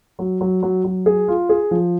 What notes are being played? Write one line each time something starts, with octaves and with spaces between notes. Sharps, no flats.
F#3
F#3
F#3
F#3
G#4
F4
G#4
F3